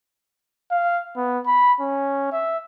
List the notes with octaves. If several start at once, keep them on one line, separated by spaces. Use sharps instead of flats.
F5
B3
B5
C#4
E5